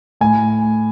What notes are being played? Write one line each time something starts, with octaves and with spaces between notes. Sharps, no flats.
A2 G#5